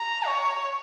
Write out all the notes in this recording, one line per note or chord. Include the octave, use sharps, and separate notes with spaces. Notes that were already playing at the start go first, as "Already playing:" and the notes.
Already playing: A#5
C#5